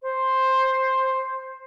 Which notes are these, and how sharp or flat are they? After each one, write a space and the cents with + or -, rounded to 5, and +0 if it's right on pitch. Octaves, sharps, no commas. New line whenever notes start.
C5 +5